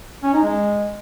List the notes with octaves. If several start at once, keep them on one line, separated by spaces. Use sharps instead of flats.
C#4
D#4
G#3